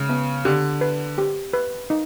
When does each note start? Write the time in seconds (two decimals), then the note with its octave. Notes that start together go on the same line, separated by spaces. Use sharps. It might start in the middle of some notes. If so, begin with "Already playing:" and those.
Already playing: C#3 G#3
0.09 B3
0.45 D3 G4
0.81 B4
1.18 G4
1.53 B4
1.90 D#4